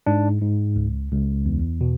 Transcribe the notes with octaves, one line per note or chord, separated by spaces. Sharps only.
G#2 D4
G#2
C#2
C#2
E2
B2